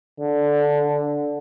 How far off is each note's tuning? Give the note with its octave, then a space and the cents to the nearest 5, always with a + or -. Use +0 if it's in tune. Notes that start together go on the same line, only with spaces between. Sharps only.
D3 -5